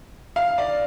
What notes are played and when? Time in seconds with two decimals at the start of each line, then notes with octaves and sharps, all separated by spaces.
0.36 F5
0.58 D5